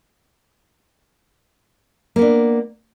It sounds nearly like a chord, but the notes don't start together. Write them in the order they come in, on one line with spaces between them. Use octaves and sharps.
A#3 B3 D4